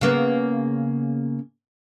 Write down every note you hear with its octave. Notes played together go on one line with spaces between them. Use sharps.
C#3 A#3 B3